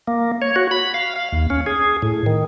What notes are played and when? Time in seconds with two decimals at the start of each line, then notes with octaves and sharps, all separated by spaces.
0.07 A#3
0.42 C#5
0.56 F#4
0.71 B5
0.94 F5
1.16 F5
1.32 D#2
1.50 C#4
1.66 G#4
2.02 A2
2.26 D#3